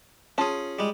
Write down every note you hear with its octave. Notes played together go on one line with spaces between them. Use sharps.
C#4 F4 G#4 A5
G3 G#3